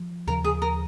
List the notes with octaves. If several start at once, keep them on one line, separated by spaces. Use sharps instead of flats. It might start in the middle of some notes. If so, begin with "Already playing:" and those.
Already playing: F3
D#2 C#3 F3 A#4
G#4
A#4